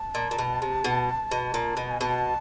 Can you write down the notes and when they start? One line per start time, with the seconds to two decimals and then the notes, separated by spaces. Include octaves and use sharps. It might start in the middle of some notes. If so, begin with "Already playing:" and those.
Already playing: A5
0.15 A#2
0.31 A#2
0.38 B2
0.62 C3
0.84 B2
1.31 B2
1.54 A#2
1.77 B2
1.91 G#5
2.01 B2 A5